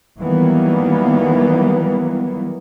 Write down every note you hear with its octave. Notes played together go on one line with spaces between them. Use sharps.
D#3 E3 F#3 G3 A#3 B3